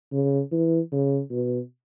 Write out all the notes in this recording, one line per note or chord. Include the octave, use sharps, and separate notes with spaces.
C#3
E3
C#3
B2